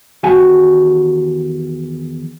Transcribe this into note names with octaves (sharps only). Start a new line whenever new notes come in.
E2 D#3 F#4 G4 G#5 A5